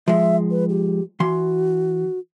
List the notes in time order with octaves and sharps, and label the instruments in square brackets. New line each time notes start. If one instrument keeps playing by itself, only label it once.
[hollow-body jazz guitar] F3 G#3 [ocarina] E5
[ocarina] B4
G4
[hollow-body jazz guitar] E3 C6 [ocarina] F#4